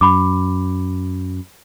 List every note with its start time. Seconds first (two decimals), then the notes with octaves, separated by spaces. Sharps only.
0.01 F#2 B5 D6